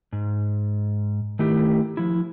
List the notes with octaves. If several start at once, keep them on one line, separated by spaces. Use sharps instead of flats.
G#2
D#3 A3 E4 G4
F3 E4